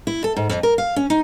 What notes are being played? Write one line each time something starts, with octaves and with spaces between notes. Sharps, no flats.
E4
A4
G#2
F2
A#4
F5
C#4
D#4